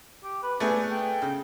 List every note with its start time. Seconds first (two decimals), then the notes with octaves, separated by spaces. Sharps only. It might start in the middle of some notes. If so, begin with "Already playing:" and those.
0.23 G4
0.43 B4
0.60 A3 B3 D4 G#4
0.91 G5
1.22 C#3